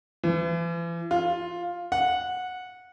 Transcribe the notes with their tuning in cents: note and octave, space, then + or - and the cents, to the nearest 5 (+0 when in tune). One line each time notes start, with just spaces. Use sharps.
E3 +40
F4 +5
F#5 -15